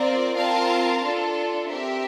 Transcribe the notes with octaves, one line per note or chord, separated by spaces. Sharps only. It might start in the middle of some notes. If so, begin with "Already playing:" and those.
Already playing: C4 F4 A#4 D5
C4 F4 A#4 F5 A5
D4 F4 A4
C4 G4 A#4 E5